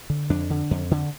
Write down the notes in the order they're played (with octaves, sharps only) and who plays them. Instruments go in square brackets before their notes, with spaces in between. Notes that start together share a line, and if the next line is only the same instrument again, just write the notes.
[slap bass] D3
F2 D4
D3
F2
D3